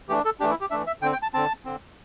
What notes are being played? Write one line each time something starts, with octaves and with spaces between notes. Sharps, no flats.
E3 A3 D4 G4
A4
E3 A3 D4 G4
E4
G4
E3 A3 D4 E5
E5
D3 C4 G5
G5
A5
D3 C4 A5
D3 C4